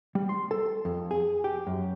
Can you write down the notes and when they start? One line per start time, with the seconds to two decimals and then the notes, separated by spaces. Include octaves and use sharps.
0.15 G3
0.29 C6
0.51 A4
0.85 F2
1.11 G#4
1.44 G4
1.67 F#2